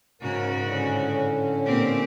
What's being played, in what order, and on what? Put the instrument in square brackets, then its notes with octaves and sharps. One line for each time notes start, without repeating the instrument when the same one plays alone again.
[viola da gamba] G#2 C#3 F#4 [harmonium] A#4 C#5
[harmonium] A2 D3 C#4
[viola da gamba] A#2 C4 G4